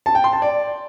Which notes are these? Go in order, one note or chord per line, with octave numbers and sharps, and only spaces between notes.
A5
G5
C6
A5
D5